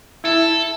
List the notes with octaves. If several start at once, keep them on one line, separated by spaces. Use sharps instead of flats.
E4 A4